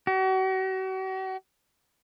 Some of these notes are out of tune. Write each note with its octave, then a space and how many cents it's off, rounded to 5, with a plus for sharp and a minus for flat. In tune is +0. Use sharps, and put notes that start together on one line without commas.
F#4 +40